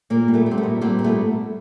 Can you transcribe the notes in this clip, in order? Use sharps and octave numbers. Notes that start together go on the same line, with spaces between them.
A#2 A#3
G3
A3 B3
G3
C4
A3 B3
A#2
G3 A#3 C4
A#2
A3 B3